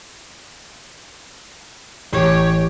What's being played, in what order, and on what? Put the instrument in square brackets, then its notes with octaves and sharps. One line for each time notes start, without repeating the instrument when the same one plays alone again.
[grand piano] A1 [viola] G4 C#5